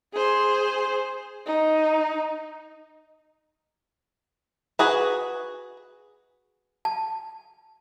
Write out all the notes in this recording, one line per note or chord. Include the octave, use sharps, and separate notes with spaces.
G#4 C5
D#4
F#4 G#4 B4
A5